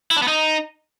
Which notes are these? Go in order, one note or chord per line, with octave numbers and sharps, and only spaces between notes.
E4
D4
B3
D#4